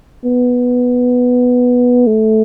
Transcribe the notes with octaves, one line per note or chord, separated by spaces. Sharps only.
B3
A3